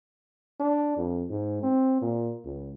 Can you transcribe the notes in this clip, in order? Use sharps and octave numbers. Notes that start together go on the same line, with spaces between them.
D4
F2
G#2
C4
A#2
C#2